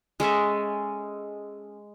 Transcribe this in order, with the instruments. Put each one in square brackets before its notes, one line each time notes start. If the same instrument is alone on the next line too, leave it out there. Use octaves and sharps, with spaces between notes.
[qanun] G#3 C#4 A4 E5